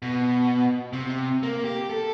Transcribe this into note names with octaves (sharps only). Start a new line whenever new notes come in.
B2
C3
A#3
G4
A4